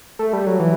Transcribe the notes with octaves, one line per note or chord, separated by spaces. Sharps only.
A3
G3
F#3
E3